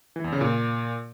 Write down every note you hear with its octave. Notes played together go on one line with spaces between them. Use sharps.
E3
E2
C#3
A#2